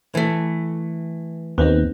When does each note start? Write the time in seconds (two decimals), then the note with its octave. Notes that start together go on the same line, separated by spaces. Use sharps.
0.15 E3 A3
1.58 D#2 B3 C4 D#4